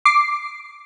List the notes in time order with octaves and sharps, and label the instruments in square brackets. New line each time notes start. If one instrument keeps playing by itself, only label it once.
[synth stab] D6 C7